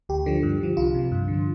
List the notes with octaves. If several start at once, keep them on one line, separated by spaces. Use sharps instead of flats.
D2 G4
D3 F3
G2
D3 F3
C2 F4
C3 F3
G2
D3
F3